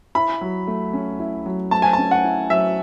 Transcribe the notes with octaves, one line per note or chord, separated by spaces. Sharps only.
E4 B5
F#3
A3
C#4
E4
F#3
A3 A5
G#5
C#4 A5
F#5
E4
F#3 E5